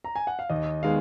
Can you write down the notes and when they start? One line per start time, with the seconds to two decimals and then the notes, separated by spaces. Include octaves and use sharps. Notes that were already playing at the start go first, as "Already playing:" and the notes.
0.04 A#5
0.16 G#5
0.27 F#5
0.39 F5
0.50 D#2 D#5
0.83 D#3 G#3 B3 F5